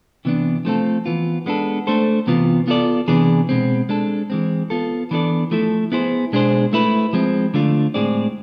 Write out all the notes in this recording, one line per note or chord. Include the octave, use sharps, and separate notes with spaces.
C3 E3 B3 D4
F3 A3 C4 F4 A4
E3 B3 F4
G#3 B3 D4 A4
A3 D4 A4 C5
C3 E3 B3 F4
B3 F4 A4 D5
C3 E3 B3 D4 G#4
B2 G#3 C4
G#3 D4 A4
E3 G#3 C4
B3 F4 A4
E3 B3 D4 A4 D5
F3 A3 E4 A4
B3 E4 G#4 C5
B2 G#3 D4 G#4 C5
A3 E4 B4
F3 G#3 C4
D3 A3 D4 F4
A2 G#3 C4 G#4 D5